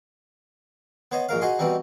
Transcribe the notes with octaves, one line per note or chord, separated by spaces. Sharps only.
B3 C5 C#5 D#5
A#1 G#2 A#4 F5
D#4 F#4 G#4 D#5 C6
B2 E3 G3 C4 D#4